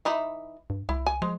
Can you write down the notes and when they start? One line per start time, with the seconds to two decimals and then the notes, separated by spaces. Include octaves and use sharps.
0.05 E3 D#4 E4
0.70 G2
0.89 C2 E4
1.06 G#5
1.22 F3 G#3